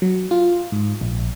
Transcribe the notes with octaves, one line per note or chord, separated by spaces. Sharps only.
F#3
F4
G#2
A#1